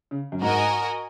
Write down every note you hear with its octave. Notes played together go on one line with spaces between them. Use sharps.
C#3
F#2
G#2 F#4 A#4 D#5 G#5